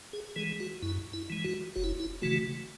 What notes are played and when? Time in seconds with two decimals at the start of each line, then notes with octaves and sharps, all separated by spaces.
0.13 G#4
0.36 E3 G#3 G#4
0.60 F#4
0.82 F#2 E4
1.13 E4
1.30 E3 G#3
1.44 F#4
1.76 F#1 F#4
1.84 E4
2.00 E4
2.22 C#3 E3 A3 F#4